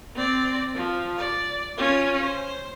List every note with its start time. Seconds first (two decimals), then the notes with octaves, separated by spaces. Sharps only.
0.16 C4 D5
0.76 F3
1.18 D5
1.78 C#4 F4
2.22 C5